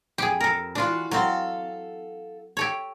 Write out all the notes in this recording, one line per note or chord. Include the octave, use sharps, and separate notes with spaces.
F2 G4 G#4
A4 A#4
E3 D4 F4 F#4
F#3 C4 A4 F5
G4 A4 C#5